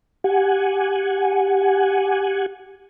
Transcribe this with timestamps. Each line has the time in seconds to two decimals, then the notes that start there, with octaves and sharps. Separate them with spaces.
0.24 G4 F#5 G#5